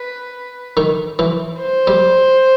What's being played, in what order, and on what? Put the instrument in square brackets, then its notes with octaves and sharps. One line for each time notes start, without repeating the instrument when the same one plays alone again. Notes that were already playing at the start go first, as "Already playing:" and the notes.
Already playing: [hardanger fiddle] B4
[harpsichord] D#3
E3
[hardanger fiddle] C5
[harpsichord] G3